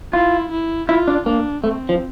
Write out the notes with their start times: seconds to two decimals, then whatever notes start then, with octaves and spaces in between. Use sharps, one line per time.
0.13 E4 F4
0.51 E4
0.89 E4 F4
1.08 D4
1.26 A#3 D4
1.64 A3 C4
1.89 F3